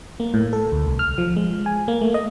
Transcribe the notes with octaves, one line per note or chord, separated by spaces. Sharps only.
A#3
A2
A4
D2
C2
F6
F3
G#3
G#5
A#3
A3
D#5